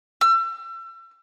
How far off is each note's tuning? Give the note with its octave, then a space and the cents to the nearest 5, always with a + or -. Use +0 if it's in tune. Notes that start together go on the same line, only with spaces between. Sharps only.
E6 +35